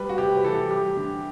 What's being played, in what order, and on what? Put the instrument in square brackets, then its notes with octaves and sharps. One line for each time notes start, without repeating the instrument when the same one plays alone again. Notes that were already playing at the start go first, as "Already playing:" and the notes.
Already playing: [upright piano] G3 B4
F#4
C3 G4
B4
E3 A4
G3 G4
D3